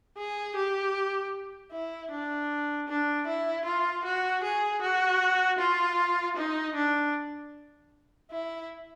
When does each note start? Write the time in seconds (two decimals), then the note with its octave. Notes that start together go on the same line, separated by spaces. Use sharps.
0.17 G#4
0.56 G4
1.72 E4
2.11 D4
2.88 D4
3.27 E4
3.65 F4
4.04 F#4
4.43 G#4
4.81 F#4
5.58 F4
6.36 D#4
6.75 D4
8.30 E4